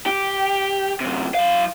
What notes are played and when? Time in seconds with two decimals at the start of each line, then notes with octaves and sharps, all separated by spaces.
0.06 G4
1.01 F#2 C3
1.35 F#3 F5